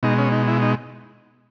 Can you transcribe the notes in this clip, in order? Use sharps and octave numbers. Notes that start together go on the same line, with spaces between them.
B2 G#3 D#4
C#4
D#4
E4
D#4